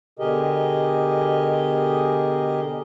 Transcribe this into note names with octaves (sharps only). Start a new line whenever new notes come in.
B2 D3 G4 G#4 A#4 D#5